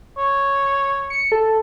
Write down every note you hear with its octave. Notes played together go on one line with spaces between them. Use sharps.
C#5
C#7
A4